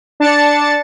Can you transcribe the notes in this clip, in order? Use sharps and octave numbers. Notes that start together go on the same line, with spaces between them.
D4 A5 A6 C#7